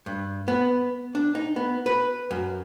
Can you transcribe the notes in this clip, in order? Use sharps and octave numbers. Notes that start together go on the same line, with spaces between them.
G2
B3
D4
D#4
B3
B4
F#2